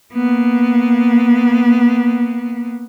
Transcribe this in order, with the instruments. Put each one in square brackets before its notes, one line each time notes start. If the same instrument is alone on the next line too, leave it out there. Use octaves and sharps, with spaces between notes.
[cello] A#3 B3